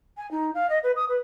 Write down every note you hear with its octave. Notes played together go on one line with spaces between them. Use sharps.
G#5
D#4
F5
D#5
B4
D#6
B4